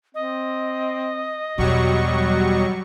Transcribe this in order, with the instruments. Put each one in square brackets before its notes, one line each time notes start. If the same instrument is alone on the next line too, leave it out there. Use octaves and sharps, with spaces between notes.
[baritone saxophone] C4 [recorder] D#5
[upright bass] E2 B2 [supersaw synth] F#3 G3 C#6 [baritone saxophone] F#4